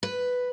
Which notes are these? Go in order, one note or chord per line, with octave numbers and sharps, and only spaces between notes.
B4